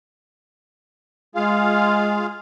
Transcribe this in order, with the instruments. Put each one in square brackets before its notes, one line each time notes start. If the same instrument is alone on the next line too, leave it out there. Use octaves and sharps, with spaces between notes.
[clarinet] G#3 [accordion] F4 G#4 F5